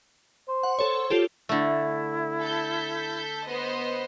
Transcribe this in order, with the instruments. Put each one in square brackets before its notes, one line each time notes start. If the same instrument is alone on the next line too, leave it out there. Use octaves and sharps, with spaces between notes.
[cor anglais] C5
[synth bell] F#5
A4 C#5
F4 G4 A4
[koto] D3 A3 [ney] E4
[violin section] A4 G6 B6
B3 C5 D#5